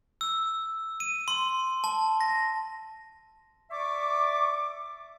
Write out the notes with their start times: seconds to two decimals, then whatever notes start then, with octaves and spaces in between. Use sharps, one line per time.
0.21 E6
1.00 D#7
1.28 C6
1.84 A5
2.21 A#6
3.71 D5 E5 C#6 D6